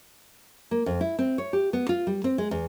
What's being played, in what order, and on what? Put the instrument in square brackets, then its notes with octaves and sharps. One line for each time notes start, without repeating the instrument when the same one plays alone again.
[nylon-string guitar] A#3
F2
E4
C4
C#5
G4
B3
F4
G3
C4
G#3
E2